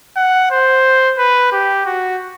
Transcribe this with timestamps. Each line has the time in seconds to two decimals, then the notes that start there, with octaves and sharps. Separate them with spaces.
0.16 F#5
0.51 C5
1.18 B4
1.52 G4
1.86 F#4